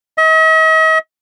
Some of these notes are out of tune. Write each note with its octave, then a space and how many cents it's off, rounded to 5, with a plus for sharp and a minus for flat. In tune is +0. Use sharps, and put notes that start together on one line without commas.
D#5 +45